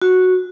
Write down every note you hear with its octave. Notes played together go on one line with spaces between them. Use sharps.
F#4